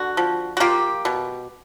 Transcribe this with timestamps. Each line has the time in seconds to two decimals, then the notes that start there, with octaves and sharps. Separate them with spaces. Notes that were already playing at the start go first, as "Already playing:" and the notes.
Already playing: D3 F#4
0.17 F3
0.57 F#4
0.60 A#3 F4 G4
1.05 B2